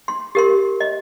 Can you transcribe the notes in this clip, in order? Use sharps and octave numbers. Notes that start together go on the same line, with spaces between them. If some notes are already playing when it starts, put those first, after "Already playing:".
C6
G4 A#4 C6
D#5